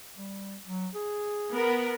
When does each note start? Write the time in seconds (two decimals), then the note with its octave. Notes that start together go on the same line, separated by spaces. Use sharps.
0.18 G3
0.65 F#3
0.95 G#4
1.53 B3 A#4